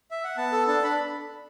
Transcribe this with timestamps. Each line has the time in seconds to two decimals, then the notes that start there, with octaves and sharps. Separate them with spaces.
0.11 E5
0.24 F#5
0.37 B3 A5
0.52 A4
0.67 D4 A5
0.83 D4 B5